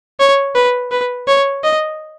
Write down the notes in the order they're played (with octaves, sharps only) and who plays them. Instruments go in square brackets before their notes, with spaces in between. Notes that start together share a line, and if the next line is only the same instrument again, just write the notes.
[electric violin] C#5
B4
B4
C#5
D#5